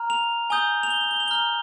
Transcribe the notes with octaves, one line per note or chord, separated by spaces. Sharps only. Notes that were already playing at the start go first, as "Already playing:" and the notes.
Already playing: A#5 F6
F7
G#5 D#6 G6 G7
F7
G7
F7
G7
F7
G7
A#5 F6 F7